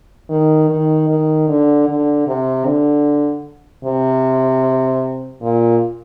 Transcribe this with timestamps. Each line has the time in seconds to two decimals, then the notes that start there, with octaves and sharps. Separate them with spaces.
0.30 D#3
0.69 D#3
1.08 D#3
1.49 D3
1.88 D3
2.27 C3
2.66 D3
3.85 C3
5.42 A#2